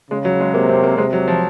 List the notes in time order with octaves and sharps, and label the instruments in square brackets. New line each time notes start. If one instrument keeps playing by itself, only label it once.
[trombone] C#3 [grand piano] G#3
[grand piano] F#3
G#3
[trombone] C3 [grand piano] A#3
[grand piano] C4
A#3
[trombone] C3 [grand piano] G#3
[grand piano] F#3
F3